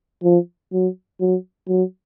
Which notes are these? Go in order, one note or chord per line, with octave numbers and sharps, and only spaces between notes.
F3
F#3
F#3
F#3